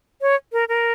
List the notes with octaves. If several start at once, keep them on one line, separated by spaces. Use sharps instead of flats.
C#5
A#4
A#4